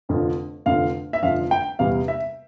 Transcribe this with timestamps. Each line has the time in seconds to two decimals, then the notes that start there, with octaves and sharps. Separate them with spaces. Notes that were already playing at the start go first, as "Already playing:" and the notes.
0.09 F1 F2 D3 F3
0.66 F1 F2 D3 F3 F5
1.13 E5
1.23 F1 F2 D3 F3 F5
1.51 G5
1.79 E2 C3 G3 B3 F5
2.08 E5